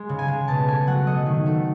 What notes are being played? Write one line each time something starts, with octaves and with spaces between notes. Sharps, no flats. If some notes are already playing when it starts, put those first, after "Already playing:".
Already playing: G#3
C#3
G#5
G#3
B2 A5
A3 G#5
F#3 F#5
A3 D#5
D#3
A3